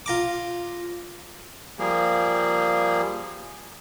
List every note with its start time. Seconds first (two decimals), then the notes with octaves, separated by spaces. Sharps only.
0.06 F4 A#5 D6
1.79 F3 G3 A#3 G#4